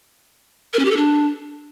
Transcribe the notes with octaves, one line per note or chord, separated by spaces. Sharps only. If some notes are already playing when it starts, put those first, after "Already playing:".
A#4
C#4
G4
A4
D4